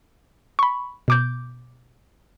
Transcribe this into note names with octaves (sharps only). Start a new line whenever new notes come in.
B5 C#6
B2 D6 G6